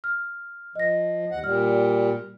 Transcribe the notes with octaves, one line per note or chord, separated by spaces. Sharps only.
F6
F3 D#5 A#6
D#2 F#5
A#2 G3 F6